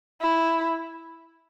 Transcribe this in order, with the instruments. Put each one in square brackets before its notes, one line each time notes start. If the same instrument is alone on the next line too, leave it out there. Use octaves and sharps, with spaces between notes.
[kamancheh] E4